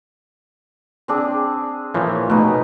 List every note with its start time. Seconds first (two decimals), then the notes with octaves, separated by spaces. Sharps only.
1.08 C4 D4 G#4
1.94 A#2 E3 F3 C#5
2.30 B2 A3 B3 D#4